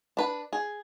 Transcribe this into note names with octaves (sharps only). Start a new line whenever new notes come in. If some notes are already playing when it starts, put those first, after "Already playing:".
D4 B4
G#4